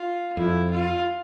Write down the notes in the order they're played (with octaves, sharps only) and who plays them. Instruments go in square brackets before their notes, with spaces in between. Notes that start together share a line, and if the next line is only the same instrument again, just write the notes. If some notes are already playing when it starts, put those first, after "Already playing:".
Already playing: [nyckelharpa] F4
[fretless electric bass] F2 [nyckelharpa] E4
[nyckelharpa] F4